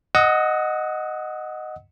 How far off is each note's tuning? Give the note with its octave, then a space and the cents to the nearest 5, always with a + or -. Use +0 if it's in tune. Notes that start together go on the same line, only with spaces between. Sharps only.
D#5 -5 F#5 +0 D#6 +45